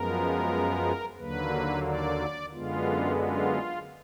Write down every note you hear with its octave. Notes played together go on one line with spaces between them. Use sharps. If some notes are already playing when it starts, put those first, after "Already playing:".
Already playing: F#2 F3 G#3 B3 A#4
D#2 D3 F#3 A#3 B4
D5
F#2 D3 G#3 B3 F4
F4